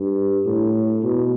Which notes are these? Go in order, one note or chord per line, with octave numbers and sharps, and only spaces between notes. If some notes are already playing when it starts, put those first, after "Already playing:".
Already playing: G2
A2
B2